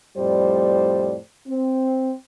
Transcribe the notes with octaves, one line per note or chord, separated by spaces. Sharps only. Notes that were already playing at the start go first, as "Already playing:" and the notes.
F2 A2 G3 C5 D5
C4